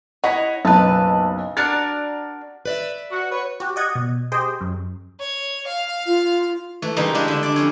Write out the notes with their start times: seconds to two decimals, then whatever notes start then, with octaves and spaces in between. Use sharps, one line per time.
0.24 E4 C#5 D#5 F#5
0.65 F#1 B1 B4 A5
1.57 D4 F#4 A#4 A6
2.66 B4 D5 E5
3.11 F#4
3.30 B4 C#5
3.60 F#4 G4
3.76 D5 D#5 F#5 G#6
3.95 B2
4.32 G4 G#4 C5 D#5 G5
4.61 F#2
5.20 C#5
5.67 F5
6.06 F4
6.82 E3 A3
6.96 C#3 E3 G3 G#3 A#3 D#4
7.14 G#3 D4 E4 G4 A4 D#5
7.28 D3 E5
7.43 D4 D5
7.56 F2 C#4 C#5